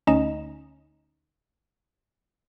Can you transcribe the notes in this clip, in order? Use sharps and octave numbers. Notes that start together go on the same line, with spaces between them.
D2 C#4 D#4 D#5 E7